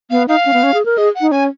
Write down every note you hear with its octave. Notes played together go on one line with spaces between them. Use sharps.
B3 F5
D#4 F5
C#4
B3
C#4
G#4
A#4
G#4 D#5
F#5
D#4
C#4 G#5